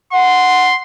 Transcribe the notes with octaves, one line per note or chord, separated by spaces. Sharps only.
F#5 C6